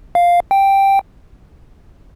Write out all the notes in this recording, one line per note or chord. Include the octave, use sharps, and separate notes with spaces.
F5
G5